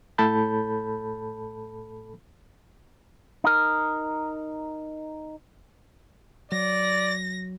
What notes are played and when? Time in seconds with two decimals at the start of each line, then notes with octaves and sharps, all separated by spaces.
0.18 A2 A4 A5 B5 G6
3.44 D#4 A#4
6.52 F#3 D5 A#6